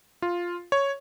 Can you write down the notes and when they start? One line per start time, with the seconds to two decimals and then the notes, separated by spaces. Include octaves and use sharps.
0.22 F4
0.72 C#5